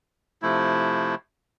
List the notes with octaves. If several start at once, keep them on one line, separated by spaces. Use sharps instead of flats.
C3 F3 A3 E4